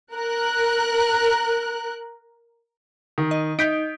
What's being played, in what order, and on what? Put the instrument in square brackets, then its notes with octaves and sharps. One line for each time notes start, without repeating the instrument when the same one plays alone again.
[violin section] A#4 F#6
[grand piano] D#3
[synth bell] D#5
[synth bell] D#4 [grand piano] G6 B6 D7